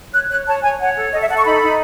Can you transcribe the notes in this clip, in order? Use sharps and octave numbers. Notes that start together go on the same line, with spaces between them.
C#5 F#6
C#5 F#6
C#5 A5
C#5 G#5
C#5 F#5
A4
A4 D#5
E5
A4 F#5
C#6
D#4 B5
D#4